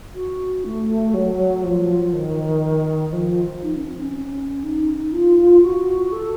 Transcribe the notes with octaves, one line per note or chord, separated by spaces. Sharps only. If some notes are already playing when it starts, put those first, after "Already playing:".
F#4
A3
F#3
F3
D#3
F3
D#4
C#4
C4
C#4
D#4
F4
F#4
A4